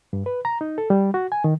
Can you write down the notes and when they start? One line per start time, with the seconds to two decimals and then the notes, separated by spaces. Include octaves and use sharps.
0.13 G2
0.26 B4
0.45 A#5
0.61 D#4
0.78 A4
0.90 G3
1.14 F#4
1.32 G#5
1.44 D#3